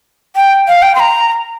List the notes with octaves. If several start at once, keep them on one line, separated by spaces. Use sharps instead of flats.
G5
F5
G5
C6
A#5